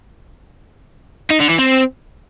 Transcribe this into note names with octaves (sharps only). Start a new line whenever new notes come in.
D#4
D3
E3
C4